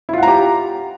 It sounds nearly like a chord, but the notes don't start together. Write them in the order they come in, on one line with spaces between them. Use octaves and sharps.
E4 F4 F#5 A#5 G4